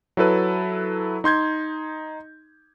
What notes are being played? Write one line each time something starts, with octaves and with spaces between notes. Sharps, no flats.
F#3 E4 A4 B4
D#4 C6 G6 G#6